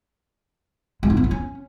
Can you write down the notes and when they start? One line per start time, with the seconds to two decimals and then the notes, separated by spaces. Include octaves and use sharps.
1.03 G#3
1.10 D#4
1.17 B3
1.24 E4
1.31 C#4